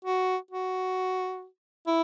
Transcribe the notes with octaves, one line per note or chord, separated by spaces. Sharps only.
F#4
F#4
E4